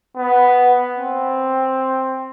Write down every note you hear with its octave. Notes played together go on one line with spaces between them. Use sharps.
B3
C4